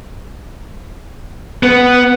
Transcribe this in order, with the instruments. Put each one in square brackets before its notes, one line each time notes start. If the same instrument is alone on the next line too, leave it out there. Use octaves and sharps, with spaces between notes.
[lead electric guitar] B3